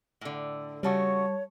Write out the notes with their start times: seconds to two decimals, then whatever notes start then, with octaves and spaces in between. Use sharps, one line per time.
0.21 A2 D3
0.83 C#3 G3 A3 F#4 C#5 A5 C#6